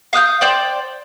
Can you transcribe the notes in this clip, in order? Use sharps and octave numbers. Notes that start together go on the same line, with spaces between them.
F5 D#6 F#6 G6
C5 D5 G5